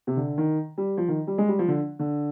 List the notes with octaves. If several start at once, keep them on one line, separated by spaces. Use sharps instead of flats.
C3
D3
D#3
G3
F3
D#3
G3
G#3
G3
F3
D3
D3